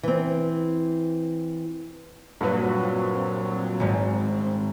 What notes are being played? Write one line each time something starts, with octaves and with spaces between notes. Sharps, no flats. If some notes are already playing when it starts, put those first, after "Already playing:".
E3 C4
G2 A#2 F#3 C4 B4
G#1 G#2